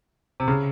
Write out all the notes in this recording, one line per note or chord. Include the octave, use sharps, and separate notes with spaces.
C3
C#3